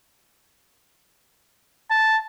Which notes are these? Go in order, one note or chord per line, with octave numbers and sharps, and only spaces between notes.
A5